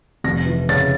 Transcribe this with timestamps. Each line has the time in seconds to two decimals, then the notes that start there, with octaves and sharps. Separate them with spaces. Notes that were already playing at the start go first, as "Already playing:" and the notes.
0.24 F1 A#6
0.46 E3
0.69 C#3 A6